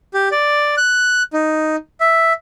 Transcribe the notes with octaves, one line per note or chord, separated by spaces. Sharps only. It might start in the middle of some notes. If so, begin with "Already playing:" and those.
G4
D5
F#6
D#4
E5